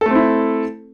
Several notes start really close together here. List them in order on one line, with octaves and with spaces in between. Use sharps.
A4 A3 C4 E4